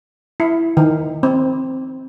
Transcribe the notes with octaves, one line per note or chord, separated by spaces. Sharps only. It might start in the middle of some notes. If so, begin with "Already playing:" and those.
E4
D#3
C4